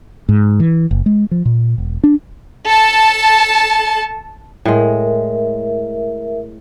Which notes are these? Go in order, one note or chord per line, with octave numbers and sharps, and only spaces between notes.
G#2
E3
F#1
G#3
F3
A#2
E1
D4
A4 A5
A2 G#3 A#4 E5